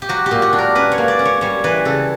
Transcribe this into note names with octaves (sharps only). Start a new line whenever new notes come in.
G4
F#3 F#4
G4
A#2
F#4
D4
A#4
C#4 B4
C#5
A#3
D5
C#4
C#5
G3 C#5
E3 B4
C#3 A4